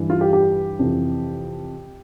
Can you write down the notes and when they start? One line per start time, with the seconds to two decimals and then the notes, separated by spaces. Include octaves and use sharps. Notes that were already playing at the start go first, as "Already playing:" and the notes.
Already playing: G2 E3
0.10 F4
0.21 G4
0.33 G4
0.79 F2 C3 E3